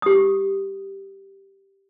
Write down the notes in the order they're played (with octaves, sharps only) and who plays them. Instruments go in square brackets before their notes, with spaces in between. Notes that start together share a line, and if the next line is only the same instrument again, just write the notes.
[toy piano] G4 D#6